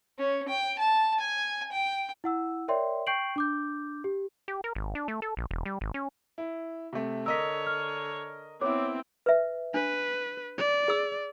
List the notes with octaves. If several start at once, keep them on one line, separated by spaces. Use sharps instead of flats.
C#4
G5
A5
G#5
G5
E4 F#5 E6
A#4 C#5 D5 E5 G5 C6
G5 C#6 G6 C7 D7 F#7
D4 D6 G6
G4
G4
A#4
G#1
D4
A3
A4
A#1
E1
G3
G#1
C#4
E4
C3 A3
D3 A#4 C#5 D#5 E6 B6
F6
B3 C4 E4 C#5 D6
B4 E5
D4 B4
D5
G#4 E6